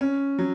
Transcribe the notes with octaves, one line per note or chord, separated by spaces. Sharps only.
C#4
F#3